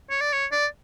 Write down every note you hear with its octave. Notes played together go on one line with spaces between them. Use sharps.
C#5
D5
C#5
D5